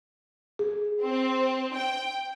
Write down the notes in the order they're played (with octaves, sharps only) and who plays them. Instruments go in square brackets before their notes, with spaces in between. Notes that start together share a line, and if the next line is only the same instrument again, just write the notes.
[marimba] G#4
[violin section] C4
G5